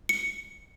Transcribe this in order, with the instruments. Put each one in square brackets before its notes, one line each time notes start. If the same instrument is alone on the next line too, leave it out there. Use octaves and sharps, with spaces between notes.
[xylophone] C#7